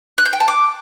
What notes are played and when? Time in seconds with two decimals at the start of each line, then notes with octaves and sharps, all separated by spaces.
0.18 F#6
0.25 G6
0.33 G5
0.40 A5
0.48 D6